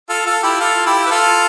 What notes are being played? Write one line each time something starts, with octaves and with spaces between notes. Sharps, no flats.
F4 A4
F4 A4
E4 G4
F4 A4
E4 G4
B4
F4 A4